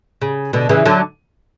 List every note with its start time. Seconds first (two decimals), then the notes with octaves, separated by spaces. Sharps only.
0.21 C#3
0.53 B2 D3
0.69 C#3 E3
0.86 D3 F#3